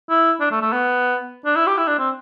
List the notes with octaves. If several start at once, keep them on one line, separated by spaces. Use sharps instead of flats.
E4
D4
A3
A3
B3
D4
E4
G4
E4
D4
C4